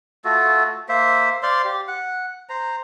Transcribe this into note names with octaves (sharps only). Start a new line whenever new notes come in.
A3 F4 F#4 A4
A#3 C5 E5
C5 D5 F5 C6
G4
F#5
C5 A#5